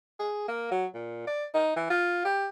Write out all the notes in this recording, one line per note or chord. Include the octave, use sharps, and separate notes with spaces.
G#4
A#3
F#3
A#2
D5
D#4
E3
F4
G4